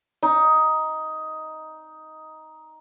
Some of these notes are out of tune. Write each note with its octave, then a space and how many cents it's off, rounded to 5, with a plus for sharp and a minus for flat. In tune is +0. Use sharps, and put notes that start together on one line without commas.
D#4 +10